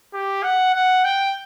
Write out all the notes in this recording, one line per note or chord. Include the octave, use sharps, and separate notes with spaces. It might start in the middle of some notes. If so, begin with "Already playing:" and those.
G4
F#5
F#5
G5